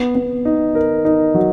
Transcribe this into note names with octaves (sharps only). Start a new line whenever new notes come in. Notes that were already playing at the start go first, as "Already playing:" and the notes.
Already playing: B3
B3
D#4
A#4
D#4
F#3